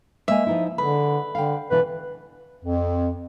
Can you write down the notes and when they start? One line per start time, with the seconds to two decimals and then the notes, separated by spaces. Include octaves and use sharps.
0.28 G#3 A#3 E5 G#5
0.46 F3 D#4 E4
0.78 D3 G#4 B4
1.35 D3 F5 G5
1.71 B2 E3 D4 B4
2.65 F2